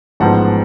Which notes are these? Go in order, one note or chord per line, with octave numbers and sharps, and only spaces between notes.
A1 G#2 F3 B3 F#5 A5